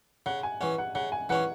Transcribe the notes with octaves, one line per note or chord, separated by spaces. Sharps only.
C#3 F#5
G#5
E3 C#4 F#5
F#5
C#3 F#5
G#5
E3 C#4 F#5